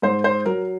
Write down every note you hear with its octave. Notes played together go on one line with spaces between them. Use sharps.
G#2 C5
C5
F#3 A#4